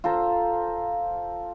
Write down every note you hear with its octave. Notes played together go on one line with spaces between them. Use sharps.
F4 A4 C5 A#5